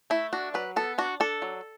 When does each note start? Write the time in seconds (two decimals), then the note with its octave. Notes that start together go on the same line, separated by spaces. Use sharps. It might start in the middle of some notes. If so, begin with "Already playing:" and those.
0.10 A3 E4
0.33 D4 F#4
0.54 F#3 B4
0.76 B3 A4
0.98 D4 F#4
1.20 D4 A4
1.42 F#3